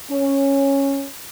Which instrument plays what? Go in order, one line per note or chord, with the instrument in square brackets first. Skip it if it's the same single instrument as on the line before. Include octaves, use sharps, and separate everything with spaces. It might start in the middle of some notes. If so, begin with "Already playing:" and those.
[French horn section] C#4